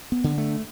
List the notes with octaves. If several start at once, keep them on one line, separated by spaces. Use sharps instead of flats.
B3
D3
A3